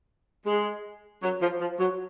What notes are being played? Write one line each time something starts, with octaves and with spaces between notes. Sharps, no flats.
G#3
F#3
F3
F3
F#3